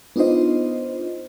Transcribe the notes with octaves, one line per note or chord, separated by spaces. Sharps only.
B3 D4 D#4 F4 C5 D#5